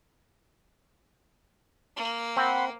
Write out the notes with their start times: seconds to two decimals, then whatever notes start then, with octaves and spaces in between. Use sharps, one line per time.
1.97 A#3
2.37 C4 F#5 B5 C6